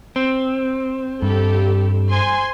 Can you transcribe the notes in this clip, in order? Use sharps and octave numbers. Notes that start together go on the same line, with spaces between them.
C4
G2 G4 A4
C5 G#5 C6